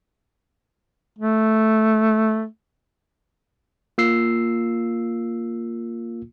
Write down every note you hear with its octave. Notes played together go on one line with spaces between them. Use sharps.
A3
A#3 F4 E6 C7